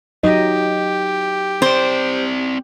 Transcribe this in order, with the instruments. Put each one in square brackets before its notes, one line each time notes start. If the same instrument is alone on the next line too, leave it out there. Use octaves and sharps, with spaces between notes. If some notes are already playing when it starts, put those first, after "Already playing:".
[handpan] F#3 D#4 D#5 [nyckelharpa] G4
[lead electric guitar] C4 D5 [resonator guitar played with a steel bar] C5